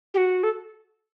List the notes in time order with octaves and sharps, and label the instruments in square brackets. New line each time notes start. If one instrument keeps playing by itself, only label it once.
[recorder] G4
F#4
A4